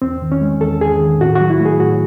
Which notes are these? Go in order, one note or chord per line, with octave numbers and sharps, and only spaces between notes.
E2 C4
D#3
C#4
G#3
E2 A4
E2 G#4
D#3
A2 F#4
F#4
F#3
E4
A3
G#4
A2 F#4